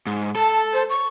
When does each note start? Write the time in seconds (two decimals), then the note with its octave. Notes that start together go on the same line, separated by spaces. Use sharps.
0.07 G#2
0.35 A4 A5
0.73 C5
0.89 C#6